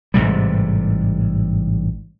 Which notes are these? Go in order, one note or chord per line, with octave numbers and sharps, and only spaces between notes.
A1 G#2 C3 G3